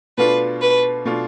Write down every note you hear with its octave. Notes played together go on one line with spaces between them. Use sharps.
B2 A3 D4 F4 B4
B4
B2 A3 D4 F4